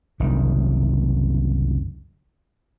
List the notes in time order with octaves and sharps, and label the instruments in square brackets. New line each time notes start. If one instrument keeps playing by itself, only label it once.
[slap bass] F#1 C2 D#3